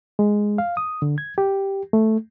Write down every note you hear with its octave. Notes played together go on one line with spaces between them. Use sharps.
G#3
F5
D#6
D3
G#6
G4
A3